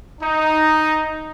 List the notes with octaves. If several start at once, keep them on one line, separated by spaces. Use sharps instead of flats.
D#4